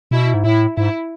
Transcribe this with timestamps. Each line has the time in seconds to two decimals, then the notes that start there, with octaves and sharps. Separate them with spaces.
0.11 B2 E4
0.34 G#2
0.44 A2 E4
0.77 G#2 E4